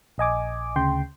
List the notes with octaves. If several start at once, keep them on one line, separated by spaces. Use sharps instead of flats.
A#1 D#5 G#5 D6
D2 C#3 G5 C6